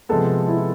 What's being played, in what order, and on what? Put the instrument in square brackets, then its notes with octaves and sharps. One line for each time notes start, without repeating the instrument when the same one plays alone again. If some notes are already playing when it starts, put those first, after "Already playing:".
[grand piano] C3 F3 G#3 B3 [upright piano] A4
[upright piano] E4